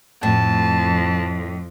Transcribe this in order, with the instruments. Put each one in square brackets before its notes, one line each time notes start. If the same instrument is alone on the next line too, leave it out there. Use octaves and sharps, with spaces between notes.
[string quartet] F2 [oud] A2 [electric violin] A5